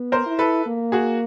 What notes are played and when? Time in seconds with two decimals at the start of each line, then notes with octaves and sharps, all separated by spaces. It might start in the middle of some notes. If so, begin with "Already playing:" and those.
Already playing: B3
0.12 A#4 C5
0.26 E4
0.39 A4 B4
0.66 A#3
0.92 F#4 G#4